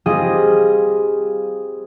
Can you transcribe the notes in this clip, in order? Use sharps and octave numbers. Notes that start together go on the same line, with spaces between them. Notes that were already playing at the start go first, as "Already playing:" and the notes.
G3 C4 F4 G#4 D#5